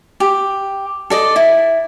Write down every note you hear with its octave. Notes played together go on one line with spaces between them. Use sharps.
G4
A4 D5 D#5
E4